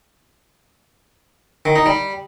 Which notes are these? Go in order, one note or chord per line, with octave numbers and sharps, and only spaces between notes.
D#3
D#4
G3